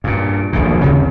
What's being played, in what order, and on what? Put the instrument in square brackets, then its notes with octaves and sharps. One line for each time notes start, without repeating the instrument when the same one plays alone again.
[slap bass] G2 A#2
D#1 A#1 F#2 A#2
D#2 C#3 C4